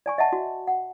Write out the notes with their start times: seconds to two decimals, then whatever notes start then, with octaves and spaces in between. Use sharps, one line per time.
0.06 D5 G#5 C#6
0.18 D#5 E5 F#5 A5
0.33 F#4
0.67 F#5